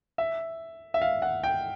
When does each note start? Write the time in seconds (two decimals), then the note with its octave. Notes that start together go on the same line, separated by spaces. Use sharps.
0.18 E5
0.94 E5
1.02 F5
1.22 F#5
1.44 G5